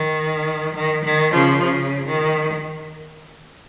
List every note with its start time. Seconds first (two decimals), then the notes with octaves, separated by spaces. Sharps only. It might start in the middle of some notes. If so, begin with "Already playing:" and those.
Already playing: D#3
0.75 D#3
1.03 D#3
1.32 C#3 F3
1.61 C#3
2.05 D#3